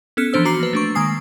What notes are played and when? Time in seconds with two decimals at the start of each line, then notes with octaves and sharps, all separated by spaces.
0.17 B3 C#4 A4 F6 C#7
0.33 E3 F3 D4 C5 E6
0.45 F#4 A#5 D6 C7 C#7
0.60 A#3 B4
0.73 A3 D4 C#6
0.95 D#3 G#3 A#3 G#5 D#6 C7